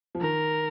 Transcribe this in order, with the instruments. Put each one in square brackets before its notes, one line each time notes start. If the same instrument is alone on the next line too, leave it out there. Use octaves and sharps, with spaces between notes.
[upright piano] F3
[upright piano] D#3 [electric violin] A#4